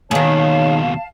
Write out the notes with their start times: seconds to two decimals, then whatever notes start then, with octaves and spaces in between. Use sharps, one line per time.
0.11 D#2 B2 D#3 G#4 C#5 F5 A5